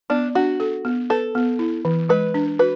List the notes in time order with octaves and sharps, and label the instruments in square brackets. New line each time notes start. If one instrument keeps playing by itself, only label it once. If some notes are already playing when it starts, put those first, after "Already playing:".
[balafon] B3 [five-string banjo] D4
[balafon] D4 [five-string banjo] F#4
[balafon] A4
B3
[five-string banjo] A4 [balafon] B4
[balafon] B3
E4
E3
[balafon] G#3 [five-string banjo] B4
[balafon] D4
[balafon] F#4 [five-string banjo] B4